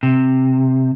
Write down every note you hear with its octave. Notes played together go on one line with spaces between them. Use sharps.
C3